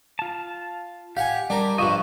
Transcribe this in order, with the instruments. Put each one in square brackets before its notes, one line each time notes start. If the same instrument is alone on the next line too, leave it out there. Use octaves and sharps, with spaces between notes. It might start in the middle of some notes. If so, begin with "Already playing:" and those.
[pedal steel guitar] F4 A5
[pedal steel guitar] G4 [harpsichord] F5 F#5 G#5
[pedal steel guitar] G3 [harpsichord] D4 A#4
[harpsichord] G2 F3 [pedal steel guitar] D#5 E5 F#5 [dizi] C#6